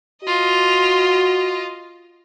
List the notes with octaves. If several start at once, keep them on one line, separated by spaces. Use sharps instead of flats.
F4 F#4 D#5